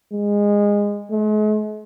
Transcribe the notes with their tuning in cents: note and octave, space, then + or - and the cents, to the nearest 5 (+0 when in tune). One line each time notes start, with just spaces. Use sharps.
G#3 -20
G#3 +45